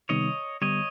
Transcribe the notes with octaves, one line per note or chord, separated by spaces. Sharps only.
C3 D#3 G3 B3 D#4 C#5 D#5
D3 G3 B3 C#5 D#5